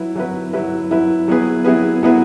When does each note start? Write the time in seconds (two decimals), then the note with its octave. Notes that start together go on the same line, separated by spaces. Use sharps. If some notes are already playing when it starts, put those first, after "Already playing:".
Already playing: F#3 E4 B4
0.16 F#3 E4 B4
0.53 F#3 E4 B4
0.90 F#3 E4 B4
1.28 F#3 B3 E4 G#4 B4
1.64 F#3 B3 E4 G#4 B4
2.03 F#3 B3 E4 G#4 B4